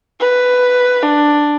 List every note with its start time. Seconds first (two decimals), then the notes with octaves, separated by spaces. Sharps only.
0.21 B4
1.03 D4